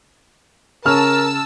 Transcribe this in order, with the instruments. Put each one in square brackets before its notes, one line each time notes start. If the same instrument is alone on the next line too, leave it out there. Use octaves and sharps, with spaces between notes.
[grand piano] C#3 C#4 F6 [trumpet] A#4 [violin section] A5 E6